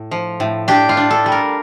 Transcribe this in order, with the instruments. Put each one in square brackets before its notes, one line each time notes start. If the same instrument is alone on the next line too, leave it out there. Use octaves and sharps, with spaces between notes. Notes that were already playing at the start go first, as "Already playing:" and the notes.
Already playing: [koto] A2
F3
A2
D4 G4
F4
D4
A4
G3
A#4